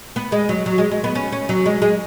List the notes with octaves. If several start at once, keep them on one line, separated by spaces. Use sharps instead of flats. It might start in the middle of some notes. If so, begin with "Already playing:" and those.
B3
G#3
F#3
F#3
G#3
G#3
B3
C#4
C#4
F#3
G#3
G#3